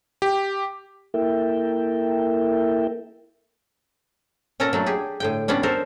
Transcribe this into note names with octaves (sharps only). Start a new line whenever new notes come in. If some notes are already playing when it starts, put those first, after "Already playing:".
G4
A#3 E4 A4 A#4 E5 G5
A#2 C#4 A4 A#4 A#5
F#3 A3 D4
G4 G#4
A2 D3 G5
G3 B3 C#4 D4
A4 A#4 C5